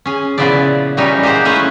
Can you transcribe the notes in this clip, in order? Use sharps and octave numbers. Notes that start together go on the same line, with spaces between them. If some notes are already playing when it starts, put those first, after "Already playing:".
C#4 G#4
A#2 C#3 F3 B3 E4 D5
A#2 E3 G3 C#4 D#4
A#3 G4 G#4 C5 F#5
A3 C#4 E4 B4 F#5